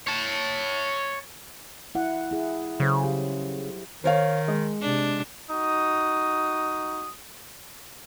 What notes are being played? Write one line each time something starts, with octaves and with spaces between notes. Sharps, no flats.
C#5 A5
E4 F#5
E4 G#4
C#3 F#3 A4 C5
G4
D#3 C5 C#5 F5
G#3
C3 D4
D#4 F#4 D#6